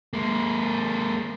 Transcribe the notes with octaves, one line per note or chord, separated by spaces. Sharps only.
G#3 A#3